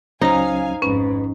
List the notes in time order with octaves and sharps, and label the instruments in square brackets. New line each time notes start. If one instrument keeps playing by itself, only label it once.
[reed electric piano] C#2 F#3 C#4 [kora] D#4 [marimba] C5 A#5 [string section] F5 G#5
[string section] G#1 F2 G#2 [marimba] C#4 [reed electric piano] B4